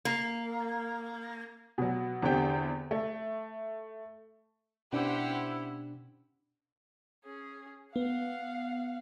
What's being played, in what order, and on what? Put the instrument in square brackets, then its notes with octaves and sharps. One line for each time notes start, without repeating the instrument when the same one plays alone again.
[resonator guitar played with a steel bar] A#3
[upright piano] B2 F#3
E2 D3 C4 G4 G5
A3
[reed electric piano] B2 D4 [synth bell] C#4 [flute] E4 [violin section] G4 C5 F#5
[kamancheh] C#4 G#4
[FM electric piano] B3 [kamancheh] F5 F#5